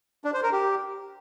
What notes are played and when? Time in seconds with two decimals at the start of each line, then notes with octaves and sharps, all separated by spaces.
0.24 D4
0.34 C5
0.43 A#4
0.52 G4